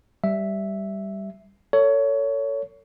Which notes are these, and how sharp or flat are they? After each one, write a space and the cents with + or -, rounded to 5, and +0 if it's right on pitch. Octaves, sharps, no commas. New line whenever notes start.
G3 +0 E5 +0
A4 +35 C#5 +20